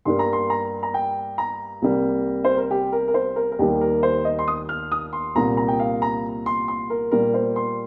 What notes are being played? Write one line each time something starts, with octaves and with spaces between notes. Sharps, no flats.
G2 G3 A#3 C6
A#5
C6
A#5
A#5
G5
A#5
C2 C3 G3 A#3
C5
A#4
G4
A#4
A#4
C5
A#4
A#4
D#2 D#3 G3 A#3 G4
A#4
C5
D#5
C6
D#6
F6
D#6
C6
C2 A#2 A#3 A#5
A#5
G5
F5
A#5
C6
C6
A#4
A#2 G3 A#3 A#4
C5
C6